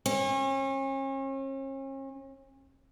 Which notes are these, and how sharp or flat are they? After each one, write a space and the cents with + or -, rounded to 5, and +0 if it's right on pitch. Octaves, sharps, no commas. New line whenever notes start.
C#4 -40